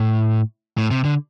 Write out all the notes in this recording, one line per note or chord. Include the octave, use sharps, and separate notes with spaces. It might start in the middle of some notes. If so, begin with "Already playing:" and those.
Already playing: A2
A2
C3
D3